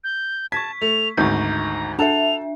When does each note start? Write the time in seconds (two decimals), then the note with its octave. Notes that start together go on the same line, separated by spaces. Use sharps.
0.04 G6
0.52 A5 C#6 G#6 B6
0.82 A3 F7
1.17 G#1 D2 G#2 A#5 C#6 G6
1.99 D4 A4 E5 F#5 A5 F7